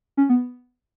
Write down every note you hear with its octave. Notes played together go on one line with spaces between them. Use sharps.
C#4
B3